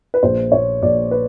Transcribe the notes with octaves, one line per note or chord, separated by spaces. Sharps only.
B4
A#1 C5
A#1 C#5
A#1 D5
B4